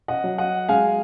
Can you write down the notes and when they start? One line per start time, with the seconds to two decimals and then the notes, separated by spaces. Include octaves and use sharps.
0.08 D#5 F#5
0.24 F#3
0.38 D#5 F#5
0.69 G#3 F5 G#5